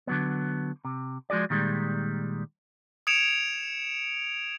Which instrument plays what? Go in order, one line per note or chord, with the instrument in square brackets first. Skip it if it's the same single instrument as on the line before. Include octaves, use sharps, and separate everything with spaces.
[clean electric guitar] D3 F#3 B3
C3
F3 G#3 F#4 G#4 D5
A#2 D#3 G3 G#3
[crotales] D#6 G#6 C#7 D7 E7 F7